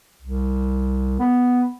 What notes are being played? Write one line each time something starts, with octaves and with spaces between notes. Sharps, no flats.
C2
B3